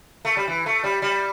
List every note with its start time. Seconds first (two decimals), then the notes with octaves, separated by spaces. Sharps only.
0.25 A3
0.37 G3
0.48 E3
0.66 A3
0.84 G3
1.02 G3